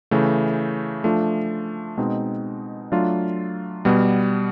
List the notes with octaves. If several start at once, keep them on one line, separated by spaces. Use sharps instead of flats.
C#3 E3 A3
F3 A3 D4 F4
B2 G#3 C4 D#4
F#3 A3 D4 F4
B2 G3 B3